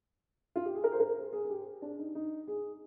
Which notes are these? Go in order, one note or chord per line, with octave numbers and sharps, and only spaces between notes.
F4
G4
G#4
A#4
C5
A#4
C5
G#4
G#4
G4
D4
D#4
D#4
G#4